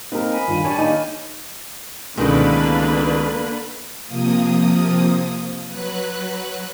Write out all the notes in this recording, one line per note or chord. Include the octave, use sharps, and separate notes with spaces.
A#3 C4 D#4 A#4 B4
G#5 B5
G2 D#3 F4
D4 G4 C#5 A5
D#3 A#3
C#2 B2 D3 D#3 A#3 B4
C3 F3 A#3 D#6
F#3 B4 F#6